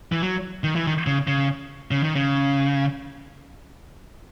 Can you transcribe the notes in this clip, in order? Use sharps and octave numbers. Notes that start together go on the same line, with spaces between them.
E3
F#3
D#3
E3
D#3
C#3
C#3
C#3
D#3
C#3